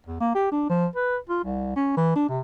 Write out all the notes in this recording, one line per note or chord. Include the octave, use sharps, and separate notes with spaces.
E2
A#3
G4
D4
F3
B4
F4
C2
C#4
E3
D4
C3